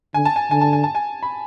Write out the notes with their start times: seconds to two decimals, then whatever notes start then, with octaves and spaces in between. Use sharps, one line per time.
0.14 D3 G#5
0.25 A5
0.36 G#5
0.51 D3 G#5
0.61 A5
0.73 G#5
0.84 A5
0.95 G#5
1.23 B5